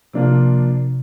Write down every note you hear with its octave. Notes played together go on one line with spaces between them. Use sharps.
C3 F3 A#3 D4 F4